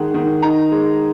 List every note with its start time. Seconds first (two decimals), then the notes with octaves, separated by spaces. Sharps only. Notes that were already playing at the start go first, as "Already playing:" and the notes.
Already playing: D#3 G#3 D#4 F#5
0.14 D#3
0.42 D#4 A#5
0.72 G#3